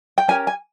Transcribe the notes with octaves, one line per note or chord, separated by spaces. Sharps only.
G5
C#4 G4 A#4 G#5
G#5